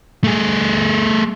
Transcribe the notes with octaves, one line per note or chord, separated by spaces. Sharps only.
A3 G#4